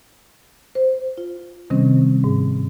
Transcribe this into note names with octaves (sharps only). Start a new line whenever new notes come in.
C5
F4
C3 D#3 G3 C4 C#4
G#2